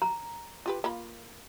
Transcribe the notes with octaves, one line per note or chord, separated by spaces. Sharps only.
A#5
F4 G4 B4
A#3 F4 B5